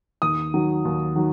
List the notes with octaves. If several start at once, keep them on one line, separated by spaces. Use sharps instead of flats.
D#2 D#6
D#3 F#3
D#2
D#3 F#3